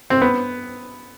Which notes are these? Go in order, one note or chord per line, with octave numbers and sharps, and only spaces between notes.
C4
B3